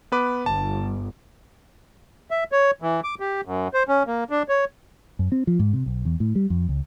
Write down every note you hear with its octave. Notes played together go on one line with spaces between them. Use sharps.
B3 B4 D6
G1 A5
E5
C#5
E3
D6
G4
F#2
C5
C#4
A#3
D4
C#5
F#2
C4
F3
G#2
C3
B1
E2
A2
G3
F2
C#2